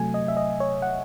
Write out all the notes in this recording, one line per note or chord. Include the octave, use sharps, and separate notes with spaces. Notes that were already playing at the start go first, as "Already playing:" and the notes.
Already playing: C3 F#3 A3 G#5
D#5
E5
D#5
C#5
F#5